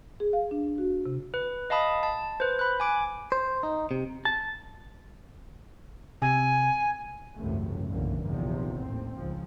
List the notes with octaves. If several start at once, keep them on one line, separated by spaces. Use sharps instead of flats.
G#4
F5
D4
F#4
C3
B4
D#5 F5 A5 B5 D#6
A5
B4 C5
B5 F#6
G#5 D6 D7
C5
D#4
C3
A5
C3 G#5
G#1 C#2 F#2 C3 E3 A3
F#1 B1 G2 D3 E3 A#3
A#1 E2 C3 D#3 F3
D#2 A2 C4
C#2 G#2 F3